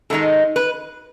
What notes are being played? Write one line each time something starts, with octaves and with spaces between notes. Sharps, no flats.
G#2 D#3 G#3 D#4 A4
B4